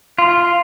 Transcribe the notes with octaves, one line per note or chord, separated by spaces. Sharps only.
F4